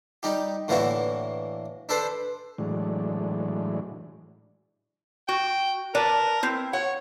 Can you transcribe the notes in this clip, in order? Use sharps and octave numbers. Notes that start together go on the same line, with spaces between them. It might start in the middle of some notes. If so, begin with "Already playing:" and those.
G3 D#4 G4
A2 D3 E3 A#3 E4 F#4
D4 A4 B4 C5
A2 E3 F#3 G#3 D4
F#4 G5
A#4 B4 D5 A5
C4 E4
C#5 F#5